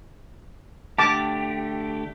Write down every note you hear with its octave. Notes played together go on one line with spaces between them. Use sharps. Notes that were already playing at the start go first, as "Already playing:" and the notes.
D3 A3 G4 A5 D6